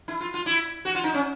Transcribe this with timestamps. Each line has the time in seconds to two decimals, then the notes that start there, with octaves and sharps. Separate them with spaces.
0.08 E4
0.21 F4
0.34 F4
0.46 E4
0.85 F#4
0.95 F4
1.04 D#4
1.14 C#4